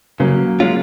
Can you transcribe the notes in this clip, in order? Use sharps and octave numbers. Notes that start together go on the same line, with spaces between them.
C#3 F#3 A#3
G#3 C#4 F4